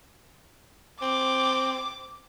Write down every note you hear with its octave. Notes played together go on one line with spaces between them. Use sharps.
C4 D6